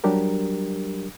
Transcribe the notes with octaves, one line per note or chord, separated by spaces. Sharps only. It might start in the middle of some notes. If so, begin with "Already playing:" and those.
F#3 G3 D4 G4 A#4